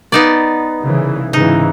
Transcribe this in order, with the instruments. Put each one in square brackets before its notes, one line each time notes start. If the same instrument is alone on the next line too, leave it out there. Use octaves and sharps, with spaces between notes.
[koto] B3 D#4 D5
[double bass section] C2 C#3 E3
[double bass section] G#2 C#3 E3 [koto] D#4